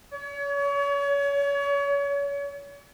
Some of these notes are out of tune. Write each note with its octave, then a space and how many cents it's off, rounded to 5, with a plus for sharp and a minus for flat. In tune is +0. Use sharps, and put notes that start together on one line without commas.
C#5 +35